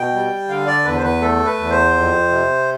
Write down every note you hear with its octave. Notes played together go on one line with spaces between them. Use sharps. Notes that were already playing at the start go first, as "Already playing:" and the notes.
Already playing: B2 G5
G3
D3 F5
D5
E2 B4
C5
B4
A3 A4
B4
E2
C5
F2
C3